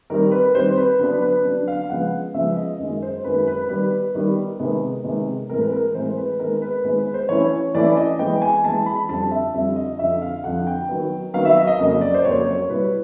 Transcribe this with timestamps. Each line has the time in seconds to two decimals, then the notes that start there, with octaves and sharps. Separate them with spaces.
0.10 D#3 G3 C4 A#4
0.31 B4
0.55 D#3 G3 C4 C5
0.77 B4
0.99 D3 F#3 B3 D4 B4
1.22 B4
1.45 D3 F#3 B3 D4
1.68 F5
1.90 C#3 F3 G#3 B3 F#5
2.34 C#3 F3 G#3 B3 E5
2.57 D#5
2.79 F#2 D#3 G#3
3.02 C5
3.24 F#2 D#3 G#3 B4
3.48 B4
3.69 D#3 G3 B3 B4
4.15 D#3 G3 B3
4.59 C3 D#3 G#3 B3
5.04 C3 D#3 G#3 B3
5.49 A2 E3 G#3 C4 A#4
5.60 B4
5.72 A#4
5.83 B4
5.95 A2 E3 G#3 C4 C5
6.17 B4
6.39 D#3 G#3 B3 A#4
6.62 B4
6.84 D#3 G#3 B3 B4
6.99 B4
7.14 C5
7.29 E3 A3 C#4 E4 C#5
7.75 E3 A3 C#4 E4 D5
7.97 D#5
8.19 E3 G#3 B3 G5
8.42 G#5
8.64 E3 G#3 B3 A5
8.86 B5
9.09 F2 D3 G3 C4 F4 A5
9.31 E5
9.54 F2 D3 G3 C4 F4 E5
9.76 D#5
9.99 F2 D3 F3 E5
10.22 F5
10.44 F2 D3 F3 F#5
10.67 G5
10.89 D#3 F#3 B3
11.34 D#3 F#3 B3 F5
11.45 E5
11.57 D#5
11.67 D#5
11.78 F2 C#3 F#3 A#3 D#5
12.01 D5
12.14 C5
12.24 F2 C#3 F#3 A#3 C#5
12.47 C#5
12.69 B2 G3 B3 E4 B4